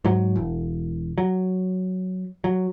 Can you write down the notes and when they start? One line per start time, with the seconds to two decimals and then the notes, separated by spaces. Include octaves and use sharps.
0.05 G#2 F#3
0.36 E1
1.18 F#3
2.44 F#3